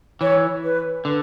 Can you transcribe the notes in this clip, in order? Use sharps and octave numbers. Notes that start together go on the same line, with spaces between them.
E3 C#5
B4
D3 B4